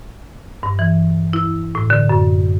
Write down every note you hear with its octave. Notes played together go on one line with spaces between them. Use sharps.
G2
E3
E4
A2
D3
F#2